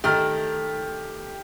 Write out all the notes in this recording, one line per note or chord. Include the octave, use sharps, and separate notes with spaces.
D#3 A3 G4 F6